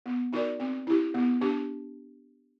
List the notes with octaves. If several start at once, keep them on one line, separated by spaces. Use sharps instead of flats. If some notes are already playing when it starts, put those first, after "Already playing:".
B3
D#4 F#4 A#4 D5
C4
E4 G4
B3
D4 G4